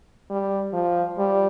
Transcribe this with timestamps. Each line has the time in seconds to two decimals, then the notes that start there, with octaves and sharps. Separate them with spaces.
0.30 G3
0.73 F3
1.18 G3